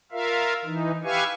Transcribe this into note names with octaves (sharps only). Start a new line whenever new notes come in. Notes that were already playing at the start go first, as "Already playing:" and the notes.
F4 A#4 E5 F5
E3 D#4
G4 B4 E5 F5 G#5 C#6